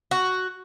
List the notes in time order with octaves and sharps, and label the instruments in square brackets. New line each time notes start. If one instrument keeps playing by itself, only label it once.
[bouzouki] F#4